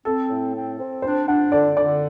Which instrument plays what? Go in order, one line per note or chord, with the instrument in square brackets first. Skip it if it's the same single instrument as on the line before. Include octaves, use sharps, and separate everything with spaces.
[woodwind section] C4 [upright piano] A4
[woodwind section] A2
C4
C4
[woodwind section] D4 [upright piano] C5
[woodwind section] D4 [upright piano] F#5
[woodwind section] D3 [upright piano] D5
[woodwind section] D3 [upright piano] D5